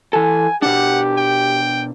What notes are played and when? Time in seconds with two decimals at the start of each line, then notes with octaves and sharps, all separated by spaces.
0.13 E3 A4 G#5
0.62 B2 D4 G4 F#5
1.18 G5